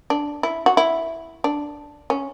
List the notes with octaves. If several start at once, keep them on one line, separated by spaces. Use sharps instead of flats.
D4
E4
F#4
E4
D4
C#4